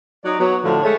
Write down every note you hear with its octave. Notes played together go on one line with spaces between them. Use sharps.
F#3 D#4 C#5 D5
F#3 B3
A2 D3 F3
G#3 A3 C#5